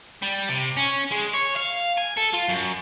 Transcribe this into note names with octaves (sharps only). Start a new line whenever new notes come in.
G3
C3
C#4
G#3
C#5
F5
G#5
A4
F4
F#2